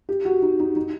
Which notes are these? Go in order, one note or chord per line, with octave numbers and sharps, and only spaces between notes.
G4
F#4
D#4
D#4
D#4